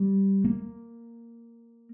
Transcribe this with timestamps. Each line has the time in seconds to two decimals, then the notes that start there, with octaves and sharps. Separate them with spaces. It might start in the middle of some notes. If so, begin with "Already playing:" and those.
Already playing: G3
0.44 A#3